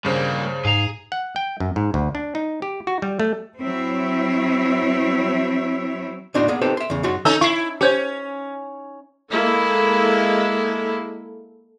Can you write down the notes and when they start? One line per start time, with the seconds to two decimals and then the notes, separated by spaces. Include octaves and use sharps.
0.05 G2 C#3 G3 A#3 C5
0.65 G#2 G#4 F5 A#5
1.12 F#5
1.36 G5
1.60 F#2
1.76 G#2
1.94 D2
2.15 D4
2.35 D#4
2.62 G4
2.87 F#4
3.02 G3
3.20 A3
3.59 F#3 C4 E4 C#5 E5
6.34 D2 A2 D4 D#4 F#4 C6
6.48 A#3 B3 G#4
6.62 C4 D#4 G4 A4 B4 C5
6.77 E5 C6
6.90 E2 C#3
7.03 F#2 D#4 F#4 C#5 C6
7.25 C#4 D#4 A4 E6
7.41 E4 C#6 C7
7.81 C#4 G4 C5 C#5
9.30 G#3 A#3 E4 A4